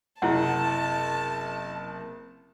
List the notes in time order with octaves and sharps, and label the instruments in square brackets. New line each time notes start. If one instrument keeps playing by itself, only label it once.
[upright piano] F#1 C3 [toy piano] E4 F#5 [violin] A5